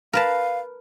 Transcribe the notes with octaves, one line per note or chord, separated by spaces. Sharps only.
A#4 B4 F5 A5